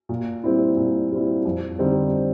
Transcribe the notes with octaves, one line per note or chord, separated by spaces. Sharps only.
A#2
G3 C4 E4
A#2
G3 C4 E4
F2
D3 G3 C4 D#4